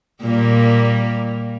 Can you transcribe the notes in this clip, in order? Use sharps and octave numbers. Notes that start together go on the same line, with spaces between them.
A#2 G3 A#3